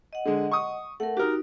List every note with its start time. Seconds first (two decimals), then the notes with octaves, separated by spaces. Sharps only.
0.13 D#5 F#5
0.25 D3 G#3
0.51 C#6 D#6
1.00 A3 A#4 F#5
1.17 D#4 F#4 G4 A#4